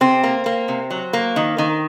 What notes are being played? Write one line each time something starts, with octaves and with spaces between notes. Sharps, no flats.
C3 C4
A#3
A#3
C3
F#3
A#3
D#3
D#3